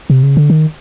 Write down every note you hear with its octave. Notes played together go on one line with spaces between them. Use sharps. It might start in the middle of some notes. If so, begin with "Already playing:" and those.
C3
C#3
D3
D#3